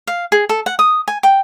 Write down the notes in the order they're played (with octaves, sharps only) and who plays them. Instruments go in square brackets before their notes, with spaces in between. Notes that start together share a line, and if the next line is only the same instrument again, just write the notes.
[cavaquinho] F5
G#4
A4
F#5
D#6
G#5
G5